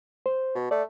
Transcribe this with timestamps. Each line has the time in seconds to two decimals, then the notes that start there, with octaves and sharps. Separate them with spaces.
0.26 C5
0.55 B2
0.71 A3 D5